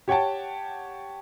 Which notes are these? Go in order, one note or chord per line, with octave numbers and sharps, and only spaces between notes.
G4 C#5 F#5 G5 A5